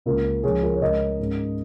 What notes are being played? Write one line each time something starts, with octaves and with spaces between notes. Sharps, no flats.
C#2 C#3 A#3 F4 A#4
C#2 C#3 F3 G#4 C#5
F4 A#4
C#5
C#2 C#3 G#3 A#4 D#5
G#2 G#3 C#4